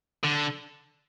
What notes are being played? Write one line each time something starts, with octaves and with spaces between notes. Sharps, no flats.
D3